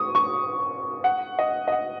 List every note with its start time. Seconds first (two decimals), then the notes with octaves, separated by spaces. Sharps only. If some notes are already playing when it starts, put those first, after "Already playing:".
Already playing: C#6 D#6
0.15 C#6
1.04 F#5
1.39 D#5
1.68 D#5
1.72 F#5